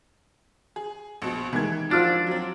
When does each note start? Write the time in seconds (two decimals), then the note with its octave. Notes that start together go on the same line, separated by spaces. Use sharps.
0.76 G#4
1.22 A#1 B2
1.53 D#3 E3 G#3 G#6
1.91 F3 D4 F4 F#4 C5 E6 A6
2.27 F#3 C4